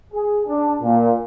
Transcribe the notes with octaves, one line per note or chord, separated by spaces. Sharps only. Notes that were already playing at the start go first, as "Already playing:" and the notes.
G#4
D4
A#2